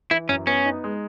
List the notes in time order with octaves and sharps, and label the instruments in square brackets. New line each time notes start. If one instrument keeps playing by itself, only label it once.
[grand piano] E3 [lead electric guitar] E4
[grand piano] F#2 [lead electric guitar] C#4
[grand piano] B3 [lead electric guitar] C#4
[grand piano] D#4
G#3